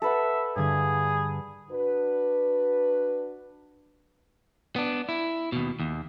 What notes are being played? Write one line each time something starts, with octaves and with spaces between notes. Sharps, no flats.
A4 B4 E5 F#5
G2 D3 G#4 G#6
D4 F#4 B4
B3 D4
E4
D#2 B2
D#2